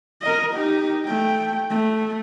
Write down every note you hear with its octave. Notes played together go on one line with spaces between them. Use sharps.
A#4 D#5
D#4 G4
A3 G5
A3